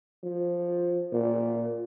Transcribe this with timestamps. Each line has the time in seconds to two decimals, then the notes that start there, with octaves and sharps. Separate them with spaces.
0.23 F3
1.12 A#2